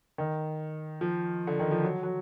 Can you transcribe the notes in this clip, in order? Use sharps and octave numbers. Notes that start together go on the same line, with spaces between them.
D#3
F3
D3
D#3
F3
F#3
F#3